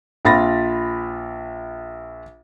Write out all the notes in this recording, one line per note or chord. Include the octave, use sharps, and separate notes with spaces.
A#1 F4 B5 A6 A#6